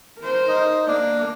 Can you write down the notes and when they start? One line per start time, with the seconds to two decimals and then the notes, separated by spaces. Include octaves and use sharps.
0.19 A#4 C5
0.49 D#4
0.88 A#3 D4